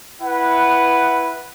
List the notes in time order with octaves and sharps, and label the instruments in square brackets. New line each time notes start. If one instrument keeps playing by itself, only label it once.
[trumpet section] E4 B4 F#5